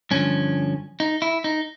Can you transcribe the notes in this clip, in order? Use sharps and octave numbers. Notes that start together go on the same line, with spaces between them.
G2 D3 F3 C#4
D#4
E4
D#4